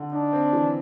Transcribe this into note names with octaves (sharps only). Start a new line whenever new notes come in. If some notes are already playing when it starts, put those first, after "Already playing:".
Already playing: D3
D4 D#4
C4
E3